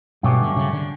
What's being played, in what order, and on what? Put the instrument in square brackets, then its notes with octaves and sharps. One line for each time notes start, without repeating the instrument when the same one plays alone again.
[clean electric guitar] G2 F#3 A3 C#4 G4 [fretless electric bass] B2
[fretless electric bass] D3
C#3
D3